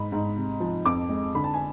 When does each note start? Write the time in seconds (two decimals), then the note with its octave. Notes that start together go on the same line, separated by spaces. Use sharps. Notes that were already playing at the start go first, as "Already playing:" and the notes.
Already playing: G#2 B5
0.12 G#2
0.37 C3
0.60 F3
0.85 F2 D6
1.09 G#3
1.35 D3 B5
1.44 A5
1.54 G#5